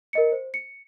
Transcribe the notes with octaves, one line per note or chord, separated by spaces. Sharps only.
A#4 D#5 C#7
C5
C#7